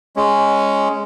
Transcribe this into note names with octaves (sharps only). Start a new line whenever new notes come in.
G#3 C#4